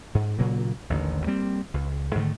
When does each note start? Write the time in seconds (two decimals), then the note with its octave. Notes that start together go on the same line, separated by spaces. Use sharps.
0.15 G#2
0.38 A#2 C#3 F#3 A#3
0.90 A1 D#2 D3 D#3
1.27 G3 A#3 C4
1.74 C#2
2.15 G#2 D3 D#3 A3